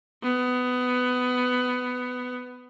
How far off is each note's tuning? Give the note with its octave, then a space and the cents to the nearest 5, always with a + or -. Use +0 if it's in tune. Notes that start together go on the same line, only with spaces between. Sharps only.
B3 +15